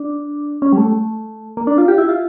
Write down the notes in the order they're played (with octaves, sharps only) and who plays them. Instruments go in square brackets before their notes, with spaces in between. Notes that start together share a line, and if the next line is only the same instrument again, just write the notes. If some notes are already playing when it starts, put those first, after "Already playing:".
Already playing: [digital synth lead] D4
C#4
G3
A3
A#3
D4
F4
G4
E4
F4